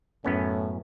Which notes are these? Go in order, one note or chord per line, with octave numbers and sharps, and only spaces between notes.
F#2 A2 B3 C#4